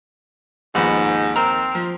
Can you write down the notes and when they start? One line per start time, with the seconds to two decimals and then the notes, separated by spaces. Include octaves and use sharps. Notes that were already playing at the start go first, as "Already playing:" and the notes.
0.75 D#2 G#2 F3 B3 F#4
1.36 C4 A#4
1.75 F3